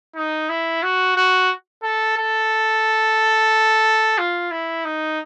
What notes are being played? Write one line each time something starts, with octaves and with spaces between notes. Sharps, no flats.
D#4
E4
F#4
F#4
A4
A4
F4
E4
D#4